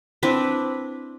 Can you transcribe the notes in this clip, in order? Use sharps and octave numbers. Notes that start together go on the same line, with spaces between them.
C4 D4 E4 B4